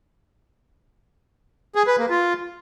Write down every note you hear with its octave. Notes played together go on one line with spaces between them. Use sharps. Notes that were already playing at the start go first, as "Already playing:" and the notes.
G#4
B4
A#3
F4